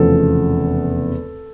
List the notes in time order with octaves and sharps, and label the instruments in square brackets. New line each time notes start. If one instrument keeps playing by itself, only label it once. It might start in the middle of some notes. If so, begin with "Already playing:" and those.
Already playing: [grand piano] F1 E2 C#3 F3 A4